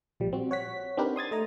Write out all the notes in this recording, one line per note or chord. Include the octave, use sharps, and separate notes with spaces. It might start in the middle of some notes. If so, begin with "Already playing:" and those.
A#1 F3 G3
C4 F#4
C#5 F#5 B6
C4 D4 D#4 G4 A#4 B4
C6 D#6 G#6 A6
A3 D#5 A#5